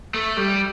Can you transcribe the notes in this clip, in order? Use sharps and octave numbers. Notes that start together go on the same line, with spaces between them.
A3
G3